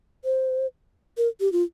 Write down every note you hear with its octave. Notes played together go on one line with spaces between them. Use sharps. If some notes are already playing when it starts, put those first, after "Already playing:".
C5
A#4
G4
F4